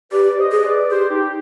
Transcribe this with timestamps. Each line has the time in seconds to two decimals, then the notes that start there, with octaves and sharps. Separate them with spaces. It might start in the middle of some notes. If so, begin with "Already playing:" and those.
0.12 G4 B4 D5
0.38 C5 D#5
0.52 G#4
0.64 B4 D5
0.90 G4 G#4 C5
1.10 D#4 G4